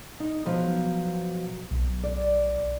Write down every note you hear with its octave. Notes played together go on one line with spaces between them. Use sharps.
D#4
B2 F3 F#3
B1
D5